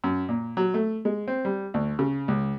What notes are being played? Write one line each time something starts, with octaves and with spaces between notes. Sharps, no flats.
F#2
A#2
F#3
A3
G#3
C4
G3
D2
C#3
C#2